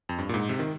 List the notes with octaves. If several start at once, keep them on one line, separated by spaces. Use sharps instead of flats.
F2
G2
A#2
G#2
C3
D#3